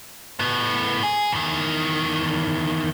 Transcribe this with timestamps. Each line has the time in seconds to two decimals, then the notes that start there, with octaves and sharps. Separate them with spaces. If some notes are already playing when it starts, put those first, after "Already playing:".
0.39 A2 B3
1.03 G#4
1.32 E2 D#3